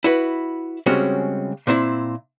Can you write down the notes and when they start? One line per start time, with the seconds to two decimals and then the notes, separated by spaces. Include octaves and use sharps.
0.04 E4 F#4 B4
0.86 C#3 G3 G#3 C4 C#4 F#4
1.67 A#2 C4 E4